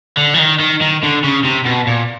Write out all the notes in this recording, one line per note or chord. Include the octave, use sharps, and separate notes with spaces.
D3
E3
D#3
D#3
D#3
D3
C#3
C3
B2
A#2